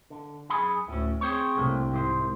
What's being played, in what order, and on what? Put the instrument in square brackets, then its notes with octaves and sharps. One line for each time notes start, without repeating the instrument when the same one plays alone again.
[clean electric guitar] D3
F#2 G#4 B5
[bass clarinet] D2 [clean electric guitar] A2 C#4
[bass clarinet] C4 [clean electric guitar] G#4 C5 C#5
[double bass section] C2 C3 [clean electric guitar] A3 A#3 D4
[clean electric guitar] G#2 C5